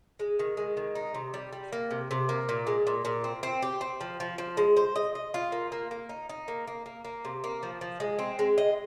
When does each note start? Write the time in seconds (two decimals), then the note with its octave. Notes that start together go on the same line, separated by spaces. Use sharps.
0.19 G#3
0.39 D#3
0.57 G#3
0.77 D#3
0.95 D#4
1.14 C3
1.34 G3
1.53 G3
1.73 A#3
1.91 C3
2.11 C3
2.29 A#3
2.49 A#2
2.67 G#3
2.87 A#2
3.05 A#2
3.24 C4
3.43 C4
3.63 G4
3.81 C4
4.01 F3
4.20 F3
4.38 F3
4.57 G#3
4.77 C5
4.96 D#5
5.15 D#5
5.34 F4
5.52 A#3
5.72 A#3
5.91 A#3
6.09 D#4
6.29 D#4
6.48 A#3
6.67 A#3
6.86 A#3
7.05 A#3
7.25 C3
7.44 A#3
7.63 F3
7.81 F3
8.00 G#3
8.19 C4
8.39 G#3
8.58 D#5